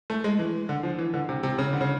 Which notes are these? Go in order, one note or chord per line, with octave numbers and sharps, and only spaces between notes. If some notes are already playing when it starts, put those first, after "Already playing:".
A3
G#3
E3
D3
F3
E3
D3
C3
C3
C#3
D3
C#3